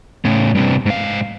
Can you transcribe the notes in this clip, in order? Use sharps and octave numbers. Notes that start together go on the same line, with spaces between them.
A2 C#3
G2 C3
G#2 F5